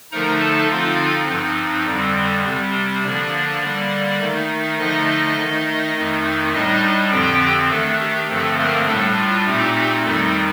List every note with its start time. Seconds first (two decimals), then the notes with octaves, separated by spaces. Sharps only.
0.12 D3 F3 A3 D#4 A#4 A#5
0.41 A4 A5
0.70 D3 F3 C4 D#4 F4 F5
1.29 G2 F3 C4 D#4
1.87 F2 D3 G3 C4
2.45 C3 G3 C4
3.03 D3 F3 A#3 D4 D5
3.62 D3 G3 A#3
4.20 D#3 A3 D#4
4.79 D3 F3 A3 D#4 D#5
5.37 D#3 A3 D#4
5.95 F2 D#3 A3 D#4
6.53 A2 G3 D4 D#4 D#5
7.12 F2 D3 F3 C4 G4 G5
7.70 D#3 A3 D4 A4
8.00 G4
8.29 G2 D3 F3 A3 C4 A4
8.58 A#3 A#4
8.87 A2 G3 A3 D4 A4
9.16 F4
9.46 A#2 A3 C4 D#4 G4
10.04 F2 D#3 G3 A3 C4 D#4 A4